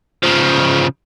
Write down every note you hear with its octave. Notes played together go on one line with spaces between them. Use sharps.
C#3 F3